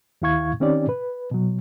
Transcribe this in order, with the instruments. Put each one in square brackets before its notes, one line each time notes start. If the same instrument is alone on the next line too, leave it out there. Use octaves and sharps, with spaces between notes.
[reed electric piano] D#2 D#3 E4 F5 C#6 G#6
D#3 C4 C#4 D#4 G4 D5
B4
B2 F#3